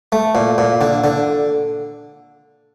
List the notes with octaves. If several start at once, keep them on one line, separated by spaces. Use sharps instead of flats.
A3
A#2
A#2
D3
D3